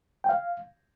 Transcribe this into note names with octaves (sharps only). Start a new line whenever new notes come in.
G5
F5